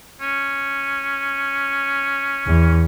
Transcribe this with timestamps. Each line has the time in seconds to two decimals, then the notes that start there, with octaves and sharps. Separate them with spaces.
0.21 C#4
2.46 E2